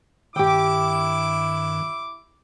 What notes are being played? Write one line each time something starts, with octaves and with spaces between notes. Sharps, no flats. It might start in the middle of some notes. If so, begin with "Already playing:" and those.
G2 D#3 E4 G4 G5 D6